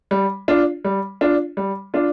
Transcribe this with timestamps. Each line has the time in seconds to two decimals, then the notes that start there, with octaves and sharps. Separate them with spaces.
0.11 G3
0.48 D4 F4
0.85 G3
1.21 D4 F4
1.57 G3
1.94 D4 F4